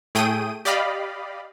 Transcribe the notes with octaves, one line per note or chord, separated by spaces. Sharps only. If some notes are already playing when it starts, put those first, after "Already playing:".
A2 A3 G#4 G5 D#6 D#7
G4 D5 D#5 F5 B5